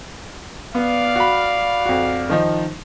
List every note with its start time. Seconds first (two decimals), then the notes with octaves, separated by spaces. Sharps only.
0.75 B3 D5 F5
1.16 F#4 B5
1.86 F2 F#4
2.30 D#3 F3 D#4